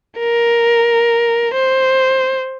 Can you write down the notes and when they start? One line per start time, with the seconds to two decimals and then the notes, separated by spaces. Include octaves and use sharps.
0.19 A#4
1.54 C5